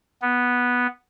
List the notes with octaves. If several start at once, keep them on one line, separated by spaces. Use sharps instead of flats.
B3